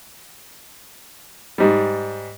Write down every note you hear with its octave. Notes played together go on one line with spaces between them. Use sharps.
G#2 G3